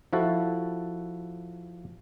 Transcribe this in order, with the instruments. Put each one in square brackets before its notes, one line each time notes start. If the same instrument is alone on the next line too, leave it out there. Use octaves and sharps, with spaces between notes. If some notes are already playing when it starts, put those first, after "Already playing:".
[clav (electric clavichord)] F3 E4 F#4 A4